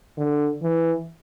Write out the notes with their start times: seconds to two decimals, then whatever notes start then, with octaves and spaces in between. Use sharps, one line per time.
0.18 D3
0.62 E3